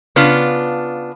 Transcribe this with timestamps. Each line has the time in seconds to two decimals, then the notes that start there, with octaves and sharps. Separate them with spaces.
0.16 C#3 B3 D4 F4